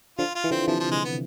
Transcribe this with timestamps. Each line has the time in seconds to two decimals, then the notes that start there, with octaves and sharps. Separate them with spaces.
0.18 D3 F3 F4
0.35 F4
0.44 E3
0.51 D3 F3 C4
0.67 C3 E3 F3
0.80 F3
0.92 G#3
1.05 B3